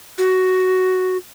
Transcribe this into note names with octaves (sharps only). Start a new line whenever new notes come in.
F#4